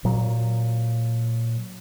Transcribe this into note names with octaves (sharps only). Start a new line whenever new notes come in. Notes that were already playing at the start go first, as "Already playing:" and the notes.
A#2 F#3